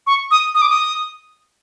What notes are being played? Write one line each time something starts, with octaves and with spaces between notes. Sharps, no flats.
C#6
D#6
D#6
D6
D#6